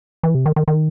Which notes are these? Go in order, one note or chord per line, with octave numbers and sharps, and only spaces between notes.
E3
C3
D#3
D#3
D#3